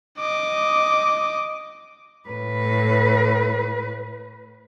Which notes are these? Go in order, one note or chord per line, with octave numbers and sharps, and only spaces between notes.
D#5 D6
A2 B4